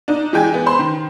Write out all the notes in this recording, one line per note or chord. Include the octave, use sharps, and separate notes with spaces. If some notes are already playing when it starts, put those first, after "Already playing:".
D4 D#4
E3 G#3 G5 G#5
B3
C5 B5 C6
D#3